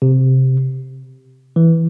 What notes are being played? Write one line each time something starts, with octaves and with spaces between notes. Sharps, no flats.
C3
E3